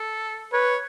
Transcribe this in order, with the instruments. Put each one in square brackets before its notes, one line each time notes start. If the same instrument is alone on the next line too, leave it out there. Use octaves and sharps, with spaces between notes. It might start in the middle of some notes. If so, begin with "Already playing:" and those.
Already playing: [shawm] A4
[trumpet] B4 [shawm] C#5